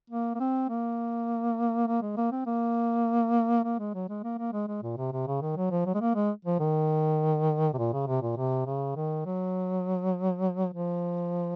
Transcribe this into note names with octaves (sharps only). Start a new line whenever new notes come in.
A#3
A#3
C4
A#3
A#3
G#3
A#3
C4
A#3
A#3
G#3
F#3
G#3
A#3
A#3
G#3
G#3
A#2
C3
C3
C#3
D#3
F#3
F3
F#3
G#3
A#3
G#3
F3
D#3
C3
A#2
C#3
C3
A#2
C3
C#3
D#3
F#3
F3